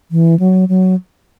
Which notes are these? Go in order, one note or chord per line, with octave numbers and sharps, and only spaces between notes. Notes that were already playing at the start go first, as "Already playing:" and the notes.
E3
F#3
F#3